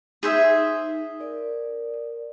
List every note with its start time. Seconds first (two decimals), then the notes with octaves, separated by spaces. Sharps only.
0.23 D#4 G#4 C5 E5
1.20 A#4 D5